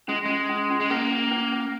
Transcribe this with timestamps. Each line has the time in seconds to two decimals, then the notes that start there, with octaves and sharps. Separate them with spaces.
0.08 G#3 C#4
0.25 G#3 C#4
0.49 C#4
0.70 C#4
0.80 G#3
0.90 A#3 C#4
1.11 C#4
1.32 C#4
1.52 C#4